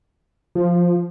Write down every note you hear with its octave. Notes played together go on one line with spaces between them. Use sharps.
F3